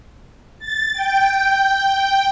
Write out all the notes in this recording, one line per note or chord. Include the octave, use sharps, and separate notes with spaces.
A6
G5